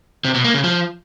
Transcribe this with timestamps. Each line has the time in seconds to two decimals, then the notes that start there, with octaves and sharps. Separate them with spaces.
0.25 C3
0.34 B2
0.44 A#3
0.54 C#3
0.64 F3